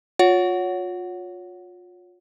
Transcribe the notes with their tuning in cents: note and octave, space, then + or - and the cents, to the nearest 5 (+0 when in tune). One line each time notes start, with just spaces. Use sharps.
F4 +35 C#5 +15 F#5 +0